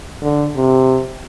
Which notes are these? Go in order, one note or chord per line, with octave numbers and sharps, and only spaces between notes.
D3
C3